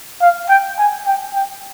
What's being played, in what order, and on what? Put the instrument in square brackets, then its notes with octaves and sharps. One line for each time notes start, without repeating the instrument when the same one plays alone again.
[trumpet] F5
G5
G#5
G5
G5